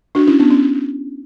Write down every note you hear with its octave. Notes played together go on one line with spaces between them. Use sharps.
D4 F#4
C#4 E4
B3 D4
C#4